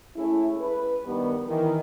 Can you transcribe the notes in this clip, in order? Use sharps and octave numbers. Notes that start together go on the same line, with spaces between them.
G#3 A3 C#4 E4
B4
G2 D#3 G3 B3
D#3 E3